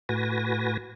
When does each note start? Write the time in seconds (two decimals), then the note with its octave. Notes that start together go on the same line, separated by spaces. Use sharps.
0.09 A2 F#4 B4 G#5 A#6